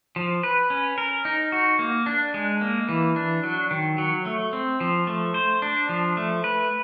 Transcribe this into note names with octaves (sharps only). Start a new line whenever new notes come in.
F3
B4
C#4
A#4
D#4
F#4
A#3
D4
G#3
A#3
E3
D4
F#3
D#3
F#3
A3
C4
F3
A3
C5
D4
F3
A3
B4